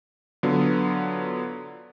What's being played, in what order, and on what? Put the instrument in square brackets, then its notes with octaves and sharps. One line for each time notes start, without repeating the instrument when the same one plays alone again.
[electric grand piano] D3 F#3 B3 F4